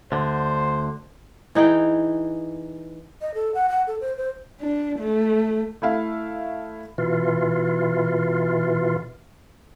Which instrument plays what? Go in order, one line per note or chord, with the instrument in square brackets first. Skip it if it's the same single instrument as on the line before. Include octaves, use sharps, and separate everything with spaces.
[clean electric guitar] D2 D3 [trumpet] C5
[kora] E3 D#4 G#4 G5
[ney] D#5
A4
F#5
F#5
A4
C5
C5
[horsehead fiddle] D4
A3
[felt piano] A3 E4 E5 F5
[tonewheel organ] B2 E3 F4